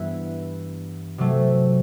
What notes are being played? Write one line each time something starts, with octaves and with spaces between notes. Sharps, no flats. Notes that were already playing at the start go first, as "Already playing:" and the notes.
Already playing: G2 E3 B3 E4 B4
C3 F#3 A3